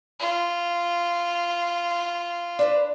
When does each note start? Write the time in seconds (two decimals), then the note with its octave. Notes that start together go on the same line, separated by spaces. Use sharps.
0.19 F4
2.59 D4 B4 C5